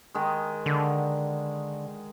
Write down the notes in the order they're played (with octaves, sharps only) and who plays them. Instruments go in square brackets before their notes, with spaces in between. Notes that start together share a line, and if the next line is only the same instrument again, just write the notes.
[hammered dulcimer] D#3 G#3
[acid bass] D3